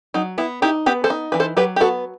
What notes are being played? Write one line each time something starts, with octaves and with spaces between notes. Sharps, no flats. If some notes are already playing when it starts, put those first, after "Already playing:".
F#3 D#4
B3 E4
D#4 E4 G4
B3 G4 B4
A4 C5
D#4
E3 B4
A4 C5
F#3 G4 B4
G4
B3 F#4 A4